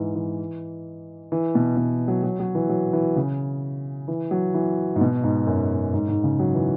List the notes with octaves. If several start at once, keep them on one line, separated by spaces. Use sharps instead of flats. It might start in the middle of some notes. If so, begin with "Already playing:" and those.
Already playing: G#2 E3
E3
E3
B2
B2
F#3
F#3
F#3
E3
F#3
E3
C#3
E3
F#3
E3
G#2
B2
G#2
F#2
G#2
G#2
C#3
F#3
E3